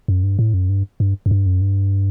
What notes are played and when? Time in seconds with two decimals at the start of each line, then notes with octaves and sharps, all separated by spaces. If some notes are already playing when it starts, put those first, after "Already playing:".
0.08 F#2
0.23 G2
0.39 A2
0.54 F#2
0.69 G2
1.00 G2
1.26 F#2
1.31 G2
1.46 F#2
1.61 G2